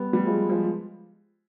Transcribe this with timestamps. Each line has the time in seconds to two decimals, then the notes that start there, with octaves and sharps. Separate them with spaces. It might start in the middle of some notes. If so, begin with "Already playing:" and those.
Already playing: G3 B3
0.13 G3 B3
0.25 F3 G#3
0.49 F3 G#3